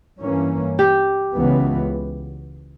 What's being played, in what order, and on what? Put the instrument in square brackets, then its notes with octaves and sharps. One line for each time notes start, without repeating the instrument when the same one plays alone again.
[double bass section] G2 E3 A#3 C#4
[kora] G4
[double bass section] C#2 C#3 E3 B3